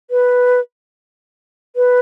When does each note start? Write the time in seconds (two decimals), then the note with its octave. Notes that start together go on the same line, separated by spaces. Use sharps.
0.10 B4
1.76 B4